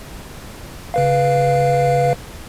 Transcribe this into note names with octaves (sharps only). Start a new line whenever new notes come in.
C#3 B4 F5